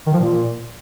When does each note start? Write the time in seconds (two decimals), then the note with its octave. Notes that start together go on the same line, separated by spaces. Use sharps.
0.07 D#3
0.13 F3
0.20 A#2